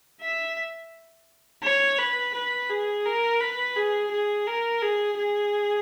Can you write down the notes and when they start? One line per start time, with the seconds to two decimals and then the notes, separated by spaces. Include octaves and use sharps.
0.22 E5
1.63 C#5
1.98 B4
2.34 B4
2.70 G#4
3.05 A#4
3.41 B4
3.76 G#4
4.11 G#4
4.47 A#4
4.82 G#4
5.18 G#4